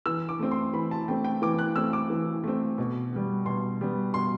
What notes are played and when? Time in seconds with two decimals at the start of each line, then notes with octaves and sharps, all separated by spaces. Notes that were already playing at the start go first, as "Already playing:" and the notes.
0.06 E3 E6
0.29 D6
0.39 A3 C4
0.51 C6
0.73 E3 B5
0.91 A5
1.08 A3 C4 G5
1.24 G5
1.42 E3 D6
1.59 F#6
1.76 A3 C4 E6
1.93 D6
2.10 E3
2.44 A3 C4
2.78 B2
3.12 G3 B3
3.46 B2 C6
3.81 G3 B3
4.14 B2 C6